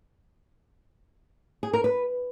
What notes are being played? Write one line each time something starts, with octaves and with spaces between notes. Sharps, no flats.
G#4
A#4
B4